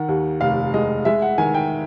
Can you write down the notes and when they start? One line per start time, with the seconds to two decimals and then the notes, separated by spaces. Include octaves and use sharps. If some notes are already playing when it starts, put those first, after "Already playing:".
Already playing: D#3 F#5
0.09 D#2
0.40 F1 F5
0.74 G#3 D#5
1.05 G#3 E5
1.22 F#5
1.38 D#3 G#5
1.54 G5